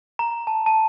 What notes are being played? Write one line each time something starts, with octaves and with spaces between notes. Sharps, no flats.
A#5
A5
A5